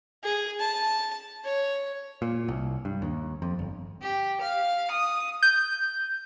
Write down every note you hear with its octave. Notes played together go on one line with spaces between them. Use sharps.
G#4
A5
C#5
A#2
C2
G2
D#2
F2
G1
G4
F5
D#6
G6